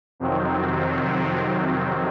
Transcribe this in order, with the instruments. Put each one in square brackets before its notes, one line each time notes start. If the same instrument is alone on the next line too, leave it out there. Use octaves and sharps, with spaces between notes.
[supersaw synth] F2 C3 D#3 F#3 C4